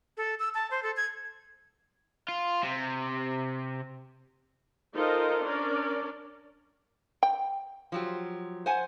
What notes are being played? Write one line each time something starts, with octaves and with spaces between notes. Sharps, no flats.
A4
E6
A5
C5
A4
G#6
F4
C3
D#4 F4 A4 A#4 C5 D#5
C#4 D4 A#4 D5
G5
F3 F#3 G4
C5 F#5 G#5